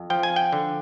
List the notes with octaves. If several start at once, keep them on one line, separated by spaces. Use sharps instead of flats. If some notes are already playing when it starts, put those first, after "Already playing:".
Already playing: F2
F3 G5
G#5
G5
D3